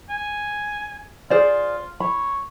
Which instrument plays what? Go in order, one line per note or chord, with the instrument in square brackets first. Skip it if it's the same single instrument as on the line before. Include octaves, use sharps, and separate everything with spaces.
[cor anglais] G#5
[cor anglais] F4 [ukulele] G#4 C5 D5
[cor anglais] C#5 [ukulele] B5